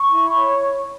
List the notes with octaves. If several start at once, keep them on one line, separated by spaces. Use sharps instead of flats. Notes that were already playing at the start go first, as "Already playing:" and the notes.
Already playing: C#6
E4
C#5